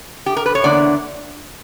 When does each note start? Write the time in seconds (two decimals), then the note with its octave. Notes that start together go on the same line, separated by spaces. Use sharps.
0.26 G4
0.37 A#4
0.46 B4
0.55 C#5
0.64 E2 D3 A#3 D4 D5